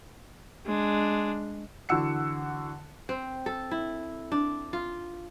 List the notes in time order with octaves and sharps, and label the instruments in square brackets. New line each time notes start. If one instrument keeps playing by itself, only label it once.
[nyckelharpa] G#3 D4
[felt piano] D3 E3 F#4 F#5 E6 C#7
[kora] C4
A4
E4
D4
F4